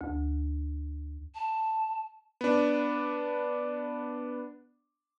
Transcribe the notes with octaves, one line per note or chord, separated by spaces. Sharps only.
D2
A5
B3 D4